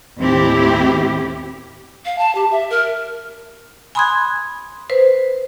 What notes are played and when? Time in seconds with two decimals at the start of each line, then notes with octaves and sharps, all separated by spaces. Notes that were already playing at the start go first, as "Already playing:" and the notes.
0.19 D#2 A2 C4 E4 G4
2.05 F5
2.18 A5
2.35 G4
2.51 E5
2.70 A#4
3.95 G#5 B5 C6 D#6 F#6 G#6
4.90 B4 C5